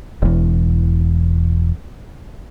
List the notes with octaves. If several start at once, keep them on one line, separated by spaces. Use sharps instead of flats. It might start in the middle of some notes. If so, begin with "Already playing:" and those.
E1 E2